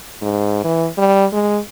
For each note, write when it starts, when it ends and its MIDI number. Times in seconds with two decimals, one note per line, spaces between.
0.21 0.60 44
0.64 0.88 52
0.98 1.25 55
1.33 1.59 56